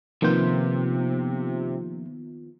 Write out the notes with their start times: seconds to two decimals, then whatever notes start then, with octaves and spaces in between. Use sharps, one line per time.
0.22 C3 D#3 F3 A#3 B3 F4 G6